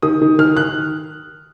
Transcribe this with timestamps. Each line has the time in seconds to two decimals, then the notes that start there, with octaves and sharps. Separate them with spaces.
0.02 D#3 D#6
0.22 D#3
0.39 D#3 F6
0.56 D#3 F#6